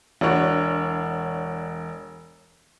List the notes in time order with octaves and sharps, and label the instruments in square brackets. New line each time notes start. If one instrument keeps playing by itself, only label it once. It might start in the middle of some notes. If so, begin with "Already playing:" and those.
[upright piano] E1 D4 F#4 C#5